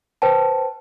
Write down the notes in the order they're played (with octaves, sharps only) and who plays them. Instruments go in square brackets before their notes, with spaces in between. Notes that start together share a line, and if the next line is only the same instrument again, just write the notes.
[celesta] B4 C5 G5 A5